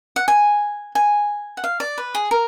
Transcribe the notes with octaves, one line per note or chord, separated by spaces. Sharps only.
F#5
G#5
G#5
F#5
F5
D5
B4
G#4
A#4